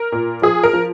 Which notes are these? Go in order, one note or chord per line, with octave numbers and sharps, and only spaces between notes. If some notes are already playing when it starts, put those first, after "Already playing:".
Already playing: A#4
A#2
F3 G#4
A#4
F3